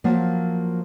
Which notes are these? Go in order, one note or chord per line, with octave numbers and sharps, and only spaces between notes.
F3 F#3 A#3 F4